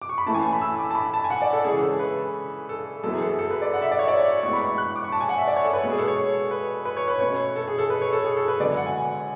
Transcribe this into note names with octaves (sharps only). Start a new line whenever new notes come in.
D6
C#6
B5
A2 E3 A3 C#4 A5
G#5
A5
B5
E6
D6
A5
B5
A5
G#5
F#5
D5
A4
C#3 E3 G#3 C#4 G#4
A4
B4
A4
F#2 E3 B3 A4
G#4
A4
A4
B4
D5
F#5
E5
D5
C#5
D5
A2 G#3 B3 C#6
B5
C#6
F#6
D6
C#6
A5
G#5
F#5
E5
D5
C#5
A4
B4
B2 G#3 B3
G#4
A4
C#5
B4
B4
C#5
B4
B2 A3 C#4 C#5
A4
G#4
A4
B4
C#5
A4
G#4
A4
B4
F#2 D3 G#3 B3 D5
F#5
G#5